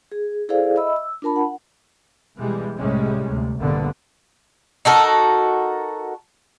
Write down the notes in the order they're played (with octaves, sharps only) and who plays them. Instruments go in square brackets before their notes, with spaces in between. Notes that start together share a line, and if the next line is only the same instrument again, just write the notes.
[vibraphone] G#4
E4 G#4 A4 C5 D5 F5
D#5 E5 B5 E6
E6
D4 F4 A#4 A5 B5
F#5
[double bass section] B2 E3 G3 G#3
C2 A2 C3 G3 G#3 C#4
D2 C3
A#1 G2 B2 D3 B3
[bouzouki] D#4 F#4 A4 A#4